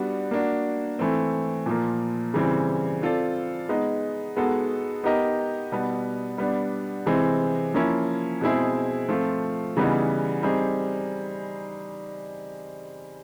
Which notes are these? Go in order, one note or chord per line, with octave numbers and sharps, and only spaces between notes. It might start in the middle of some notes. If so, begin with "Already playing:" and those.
Already playing: G3 B3 D4 F#4
A#3 D4 F#4
E3 A3 C4
A#2 F3 A#3
C#3 E3 G3 C4
C4 F4 A4 D5
G#3 B3 D#4
G#3 B3 D#4 F#4 A4
B3 D#4 G4 A#4 D#5
B2 G3 B3
G3 B3 D4
C3 E3 G#3 C4
F3 A#3 C#4 E4
B2 G#3 C4 E4 G#4
F3 A3 C4 F4
C#3 E3 G3 B3 D#4
G3 C4 D#4 G#4